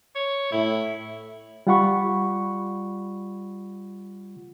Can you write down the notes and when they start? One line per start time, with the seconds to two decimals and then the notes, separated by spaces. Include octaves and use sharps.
0.15 C#5
0.52 A2 E4
1.67 G3 F4 F#5 B5 C#6